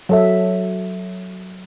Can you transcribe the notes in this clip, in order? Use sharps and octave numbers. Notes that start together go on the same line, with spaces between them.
F#3 A4 E5